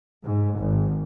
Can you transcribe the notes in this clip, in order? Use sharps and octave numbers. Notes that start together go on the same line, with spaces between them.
G#2
G#1